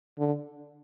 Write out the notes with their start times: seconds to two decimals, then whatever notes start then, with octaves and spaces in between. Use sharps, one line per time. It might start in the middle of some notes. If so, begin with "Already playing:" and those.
0.19 D3